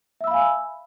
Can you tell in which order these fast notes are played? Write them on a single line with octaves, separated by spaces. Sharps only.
E5 E6 B5 F5 G#5